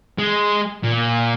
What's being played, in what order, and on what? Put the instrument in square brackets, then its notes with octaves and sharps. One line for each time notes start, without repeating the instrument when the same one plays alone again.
[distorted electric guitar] G#3
A#2